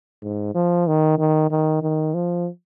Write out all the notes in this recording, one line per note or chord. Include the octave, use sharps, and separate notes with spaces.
G#2
F3
D#3
D#3
D#3
D#3
F3